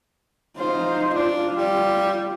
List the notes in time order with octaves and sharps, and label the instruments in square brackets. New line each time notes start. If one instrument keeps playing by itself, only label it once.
[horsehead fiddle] D#4 C5 [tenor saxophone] F4
[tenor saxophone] D4 [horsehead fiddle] F4
[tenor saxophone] G3